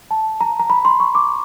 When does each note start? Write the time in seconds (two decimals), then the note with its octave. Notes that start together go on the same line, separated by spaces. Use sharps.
0.11 A5
0.41 A#5
0.60 A#5
0.70 B5
0.85 C6
1.00 C#6
1.15 D6